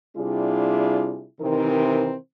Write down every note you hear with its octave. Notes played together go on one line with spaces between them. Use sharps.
C3 G3 D4 E4 F4 G#4
C3 D#3 E3 C4 D#4 A#4